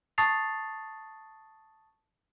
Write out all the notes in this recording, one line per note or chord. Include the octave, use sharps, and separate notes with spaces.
A5 C#6 D#6 A6 C7 F7